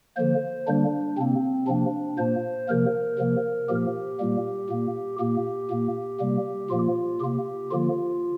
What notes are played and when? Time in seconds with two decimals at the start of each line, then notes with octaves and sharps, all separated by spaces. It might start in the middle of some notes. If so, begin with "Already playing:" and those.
0.17 D3 F3 A#3 C5
0.67 D3 G3 A#3 D4
1.17 C3 A#3 C4
1.68 C3 F3 A#3 D4
2.18 A#2 A#3 C5
2.68 C3 F3 A#3 A#4
3.18 C3 F3 A#3
3.69 A#2 F3 A#3 G4
4.20 A#2 G3 A#3
4.69 A#2 A#3
5.20 A#2 A#3 G4
5.71 A#2 A#3
6.20 C3 G3 A#3
6.70 A#2 F3 A#3 F4
7.21 C3 A#3 G4
7.71 D3 F3 A#3 F4